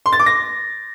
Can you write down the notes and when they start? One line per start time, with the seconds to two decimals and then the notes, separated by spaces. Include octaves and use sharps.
0.06 C6
0.13 A6
0.19 D6
0.26 A#6